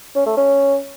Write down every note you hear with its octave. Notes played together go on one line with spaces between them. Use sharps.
C#4
A3
C#4